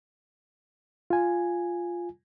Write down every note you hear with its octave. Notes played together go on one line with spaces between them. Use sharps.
F4 G#5